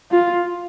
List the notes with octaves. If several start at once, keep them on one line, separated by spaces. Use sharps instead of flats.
F4